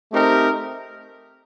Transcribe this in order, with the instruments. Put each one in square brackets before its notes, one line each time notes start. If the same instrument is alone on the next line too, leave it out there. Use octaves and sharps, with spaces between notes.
[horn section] A3 C4 D#4 G4 A#4